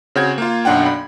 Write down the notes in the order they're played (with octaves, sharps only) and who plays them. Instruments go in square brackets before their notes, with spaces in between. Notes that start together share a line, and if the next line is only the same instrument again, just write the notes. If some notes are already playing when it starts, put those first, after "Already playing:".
[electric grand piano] C#3 C4 F#4 G6 G#6
A#3 F4
B1 F#2 D4 F#5 G5
B5